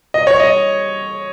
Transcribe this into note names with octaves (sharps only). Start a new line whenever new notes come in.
D#5
C#5
D#5